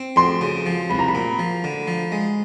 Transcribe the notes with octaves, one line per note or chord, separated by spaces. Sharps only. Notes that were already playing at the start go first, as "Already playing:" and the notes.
Already playing: C4
F2 C6
C#3
F3
C2 B5
A#5
B5
A#2
F3
D3
F3
G#3